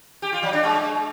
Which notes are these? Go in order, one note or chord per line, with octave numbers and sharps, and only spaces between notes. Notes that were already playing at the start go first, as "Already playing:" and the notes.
G4
F4
F#3
D4
G#3